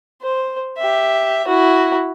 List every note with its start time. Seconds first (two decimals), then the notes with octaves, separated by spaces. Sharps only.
0.22 C5
0.78 G4 E5
1.47 E4 F#4